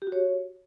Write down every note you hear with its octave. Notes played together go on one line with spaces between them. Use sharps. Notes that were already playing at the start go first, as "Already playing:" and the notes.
G4
F#4
C#5